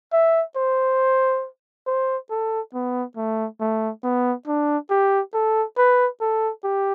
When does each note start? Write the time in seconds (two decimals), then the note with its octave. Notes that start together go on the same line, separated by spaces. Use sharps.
0.12 E5
0.56 C5
1.87 C5
2.30 A4
2.74 B3
3.16 A3
3.60 A3
4.04 B3
4.47 D4
4.90 G4
5.34 A4
5.77 B4
6.20 A4
6.64 G4